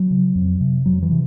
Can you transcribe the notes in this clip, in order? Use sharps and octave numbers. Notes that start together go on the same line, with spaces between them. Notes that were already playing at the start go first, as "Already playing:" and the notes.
Already playing: F#3
C#3
F2
C3
F2 F#3
E3
C3